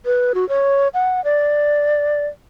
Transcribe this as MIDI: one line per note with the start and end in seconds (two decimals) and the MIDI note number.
0.06 0.32 71
0.35 0.47 66
0.49 0.88 73
0.94 1.23 78
1.24 2.26 74